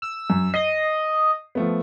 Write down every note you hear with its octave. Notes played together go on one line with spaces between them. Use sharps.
E6
F#2
D#5 C7
F3 A3 B3